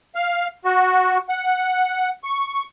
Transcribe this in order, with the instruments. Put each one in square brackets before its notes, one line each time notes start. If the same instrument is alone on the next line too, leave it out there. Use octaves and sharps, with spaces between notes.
[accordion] F5
F#4
F#5
C#6